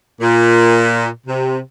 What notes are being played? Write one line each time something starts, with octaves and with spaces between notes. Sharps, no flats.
A#2
C3